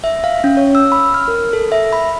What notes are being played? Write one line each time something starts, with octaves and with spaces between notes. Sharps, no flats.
E5
F5
C#4
C#5
E6
B5
F6
A#4
A4
E5
B5